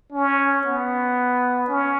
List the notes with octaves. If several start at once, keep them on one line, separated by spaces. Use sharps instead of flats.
C#4
B3
C#4